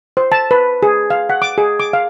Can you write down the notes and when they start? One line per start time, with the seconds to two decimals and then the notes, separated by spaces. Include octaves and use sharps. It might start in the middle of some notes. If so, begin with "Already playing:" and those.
0.17 C5
0.32 A5
0.51 B4
0.83 G#4
1.10 F5
1.30 F#5
1.42 D6
1.58 G#4
1.80 D6
1.93 F5